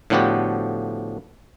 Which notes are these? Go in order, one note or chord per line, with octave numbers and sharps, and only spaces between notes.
A2 D3 F3 B3 F#4 G4